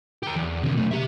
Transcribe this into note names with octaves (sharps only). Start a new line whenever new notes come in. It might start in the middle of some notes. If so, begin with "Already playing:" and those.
G4 A#4
E2
D#2 C3
B1 A3
G4 E5